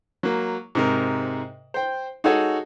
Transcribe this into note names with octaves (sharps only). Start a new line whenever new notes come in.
F#3 A#3
G#2 C3 A#4
C5 G5
D#4 F#4 G#4 A4 C#5 F#5